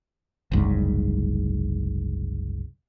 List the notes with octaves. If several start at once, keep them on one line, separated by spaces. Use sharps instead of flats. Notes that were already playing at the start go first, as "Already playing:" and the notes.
F#1 C2 G#2